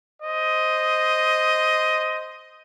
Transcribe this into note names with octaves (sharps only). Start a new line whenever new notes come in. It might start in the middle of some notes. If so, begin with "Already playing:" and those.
C5 D#5